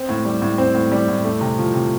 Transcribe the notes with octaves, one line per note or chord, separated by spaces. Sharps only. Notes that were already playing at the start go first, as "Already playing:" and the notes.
Already playing: C4
A2
G3
A2
C4
A2
G3
A2
A3
C3
F3
C3